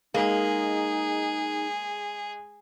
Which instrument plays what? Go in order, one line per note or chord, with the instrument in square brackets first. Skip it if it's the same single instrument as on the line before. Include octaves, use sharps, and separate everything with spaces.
[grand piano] G#3 [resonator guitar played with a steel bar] A#3 [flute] D#4 [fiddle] G#4